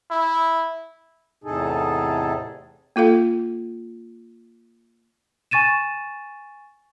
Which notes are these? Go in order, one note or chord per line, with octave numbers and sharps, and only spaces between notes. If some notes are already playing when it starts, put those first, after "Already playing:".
E4
E2 A2 C3 D#4 G#4 A4
A#3 F4 A4 F5
G#5 C#6 A6 D#7 E7